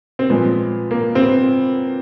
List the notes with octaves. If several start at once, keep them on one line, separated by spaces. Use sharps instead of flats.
C4
A#2 F3 G#3 B3
A#3
C4
B3